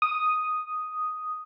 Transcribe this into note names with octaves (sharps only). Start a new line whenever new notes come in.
D#6